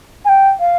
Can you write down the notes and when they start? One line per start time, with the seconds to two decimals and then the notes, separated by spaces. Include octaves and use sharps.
0.25 G#5
0.29 G5
0.60 F5